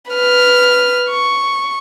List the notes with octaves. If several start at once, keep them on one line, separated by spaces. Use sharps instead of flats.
B4 F6
C#6